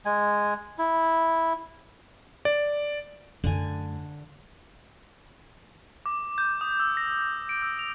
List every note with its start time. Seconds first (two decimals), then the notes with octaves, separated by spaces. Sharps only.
0.05 G#3 G#5
0.78 E4
2.45 D5
3.44 F#2 D3 A3 G#5
6.06 D6
6.38 G6
6.61 D#6
6.80 E6
6.97 A#6
7.21 A#6
7.49 D7
7.62 E6
7.79 F7